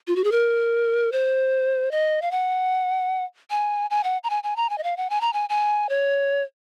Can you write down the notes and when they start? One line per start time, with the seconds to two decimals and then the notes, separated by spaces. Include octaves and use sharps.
0.08 F4
0.16 F#4
0.24 G#4
0.32 A#4
1.12 C5
1.91 D#5
2.22 F5
2.31 F#5
3.51 G#5
3.90 G#5
4.04 F#5
4.24 A#5
4.30 G#5
4.43 G#5
4.56 A#5
4.70 G#5
4.78 D#5
4.84 F5
4.97 F#5
5.10 G#5
5.21 A#5
5.33 G#5
5.49 G#5
5.89 C#5